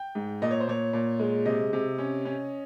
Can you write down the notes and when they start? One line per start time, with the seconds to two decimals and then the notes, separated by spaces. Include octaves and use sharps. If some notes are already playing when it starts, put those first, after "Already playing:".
Already playing: G5
0.15 G#2
0.42 A#2 D#5
0.51 C#5
0.60 C5
0.67 A#2 C#5
0.93 A#2
1.19 G#3
1.46 C3 D#5
1.73 C3
1.98 C#4
2.25 C#4